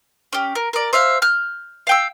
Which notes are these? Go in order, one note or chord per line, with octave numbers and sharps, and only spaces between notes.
C#4 G4
A#4
A#4 D5
C5 E5 F5
F6 G6
F5 G5 E6